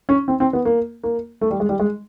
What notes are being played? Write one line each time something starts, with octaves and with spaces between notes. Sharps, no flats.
C#4
C4
C4
B3
A#3
A#3
A3
G3
G#3
G3
G#3